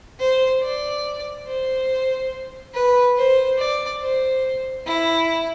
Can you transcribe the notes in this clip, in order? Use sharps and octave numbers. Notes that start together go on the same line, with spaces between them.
C5
D5
C5
B4
C5
D5
C5
E4